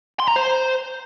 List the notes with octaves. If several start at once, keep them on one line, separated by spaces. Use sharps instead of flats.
C6
A#5
C5